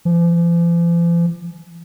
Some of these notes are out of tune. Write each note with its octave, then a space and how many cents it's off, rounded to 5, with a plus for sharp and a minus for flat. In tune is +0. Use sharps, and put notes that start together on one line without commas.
F3 -45